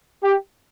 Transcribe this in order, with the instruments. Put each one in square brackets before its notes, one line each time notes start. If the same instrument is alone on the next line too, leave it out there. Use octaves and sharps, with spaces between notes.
[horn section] G4